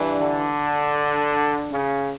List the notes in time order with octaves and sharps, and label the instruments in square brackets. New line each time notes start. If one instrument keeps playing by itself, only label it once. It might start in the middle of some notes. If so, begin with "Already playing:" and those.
Already playing: [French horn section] G2 E3 G3 D4
[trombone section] D3
C#3